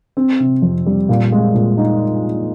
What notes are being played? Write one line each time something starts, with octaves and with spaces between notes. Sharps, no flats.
C4
C3
F2
G3
A#2
G#3
A#2
D#4